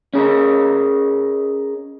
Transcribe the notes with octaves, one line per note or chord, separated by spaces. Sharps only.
C#4 G#4 A#4 D#5